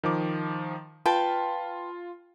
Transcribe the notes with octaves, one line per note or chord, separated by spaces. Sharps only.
D#3 F3 D6
F4 B4 G5 A5